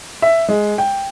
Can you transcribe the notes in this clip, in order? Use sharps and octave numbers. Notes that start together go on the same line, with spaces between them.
E5
G#3
G5